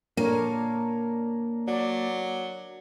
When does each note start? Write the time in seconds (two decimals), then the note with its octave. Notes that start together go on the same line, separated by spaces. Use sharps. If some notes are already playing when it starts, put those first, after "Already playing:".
0.17 A#2 A#3 D4 A#4 C#5
1.67 F#3 D5